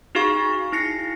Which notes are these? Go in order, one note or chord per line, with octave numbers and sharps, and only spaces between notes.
D#4 F#4 G#4 F5 C#6
D#4 E4 A#6 C7 C#7